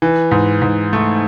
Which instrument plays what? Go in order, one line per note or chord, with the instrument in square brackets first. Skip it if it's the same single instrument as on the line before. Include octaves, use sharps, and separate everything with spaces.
[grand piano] E3
G#2
G#2
A3